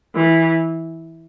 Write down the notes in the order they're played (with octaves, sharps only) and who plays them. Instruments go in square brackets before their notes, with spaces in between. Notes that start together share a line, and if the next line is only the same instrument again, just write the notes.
[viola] E3